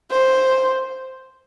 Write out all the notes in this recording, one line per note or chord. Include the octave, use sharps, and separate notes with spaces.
C5